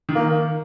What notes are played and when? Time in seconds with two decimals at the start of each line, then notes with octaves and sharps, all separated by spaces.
0.09 D#3
0.15 A#3